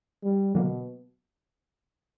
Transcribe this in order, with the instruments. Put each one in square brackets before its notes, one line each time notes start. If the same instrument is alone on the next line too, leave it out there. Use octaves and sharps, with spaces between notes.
[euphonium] G3
[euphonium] B2 [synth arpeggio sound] D3 F#3 A#3